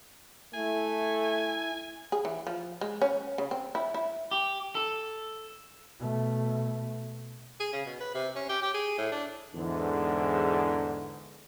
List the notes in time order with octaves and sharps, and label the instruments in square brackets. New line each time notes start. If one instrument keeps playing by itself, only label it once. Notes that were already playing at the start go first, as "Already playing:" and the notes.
[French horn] A3 [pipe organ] E4 [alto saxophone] G#5
[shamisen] G#4
E3
F3
G#3
C#4
C#3
C4
E4
E4
[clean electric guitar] G4
A4
[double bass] B2 A3
[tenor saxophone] G#4
C#3
B2
B4
C3
C#4
G4
G4
G#4
A2
D4
[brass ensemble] E2 G#2 D3